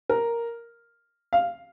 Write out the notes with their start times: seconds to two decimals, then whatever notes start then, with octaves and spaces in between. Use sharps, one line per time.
0.10 A#4
1.33 F5